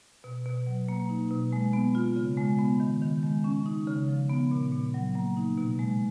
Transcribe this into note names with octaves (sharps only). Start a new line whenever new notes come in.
B2
B2
F#3
A#3
D#4
B2
G#3
B3
F4
C#3
G#3
B3
D#3
D#3
G#3
C#4
D#4
C#3
F3
B3
A#2
A#2
F#3
A#3
D#4
B2
G#3